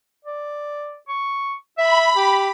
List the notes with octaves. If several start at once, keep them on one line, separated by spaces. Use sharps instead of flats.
D5
C#6
E5 B5
G4